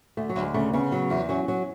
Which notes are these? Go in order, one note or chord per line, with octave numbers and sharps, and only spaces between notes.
D2 A3
F#3
D2
G#3
C#3 A3
C#3 B3
F#3
E2
F#3 C#4
F#3